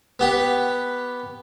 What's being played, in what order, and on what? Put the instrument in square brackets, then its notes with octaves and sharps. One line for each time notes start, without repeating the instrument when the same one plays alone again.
[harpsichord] B3 G4 B4